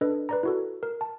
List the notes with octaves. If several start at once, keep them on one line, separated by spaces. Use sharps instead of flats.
D4 A4 B4 D#5
B4 D5 A#5
E4 F#4 A4
A#4
A5